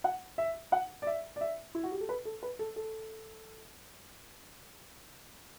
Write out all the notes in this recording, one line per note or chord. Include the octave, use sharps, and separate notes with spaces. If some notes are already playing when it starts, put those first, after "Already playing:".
F#5
E5
F#5
D5
E5
D5
E5
E4
F#4
G4
A4
B4
A4
B4
A4
A4